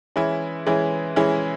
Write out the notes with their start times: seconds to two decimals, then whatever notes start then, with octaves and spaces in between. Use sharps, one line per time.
0.16 E3 G#3 C#4 E4
0.66 E3 G#3 C#4 E4
1.16 E3 G#3 C#4 E4